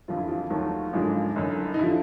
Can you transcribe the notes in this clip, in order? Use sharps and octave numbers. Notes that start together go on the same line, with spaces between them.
F#1 F2 D3 F4
E4
F3 F4
D#2 D#3 F#3 A3
G#1 F#2 D3 F3 G#3 D#4
F#1 F#2 D3
D#4
D3 F3 E4